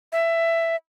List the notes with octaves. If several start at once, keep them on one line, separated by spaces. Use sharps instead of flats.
E5